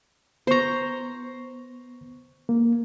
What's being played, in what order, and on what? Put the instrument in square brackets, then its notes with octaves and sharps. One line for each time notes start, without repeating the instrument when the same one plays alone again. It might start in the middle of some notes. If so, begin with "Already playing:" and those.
[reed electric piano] B3 C#6 [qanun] C5 A#5
[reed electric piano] A#3